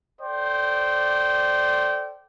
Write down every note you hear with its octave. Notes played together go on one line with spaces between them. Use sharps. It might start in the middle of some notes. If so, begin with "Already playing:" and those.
A4 C5 D5 G5